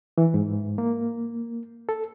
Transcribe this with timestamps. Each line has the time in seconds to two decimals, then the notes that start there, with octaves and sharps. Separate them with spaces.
0.18 E3
0.34 G#2
0.78 A#3
1.89 A4